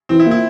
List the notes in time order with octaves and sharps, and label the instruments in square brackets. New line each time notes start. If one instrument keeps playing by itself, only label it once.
[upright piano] E3 [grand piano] C4
[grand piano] E4
[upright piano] A#3 F4
[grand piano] E4